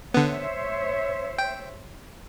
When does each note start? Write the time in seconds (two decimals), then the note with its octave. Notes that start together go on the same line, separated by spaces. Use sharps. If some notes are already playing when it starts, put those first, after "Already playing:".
0.14 D3 B3 C5 C#5 E5
1.39 G5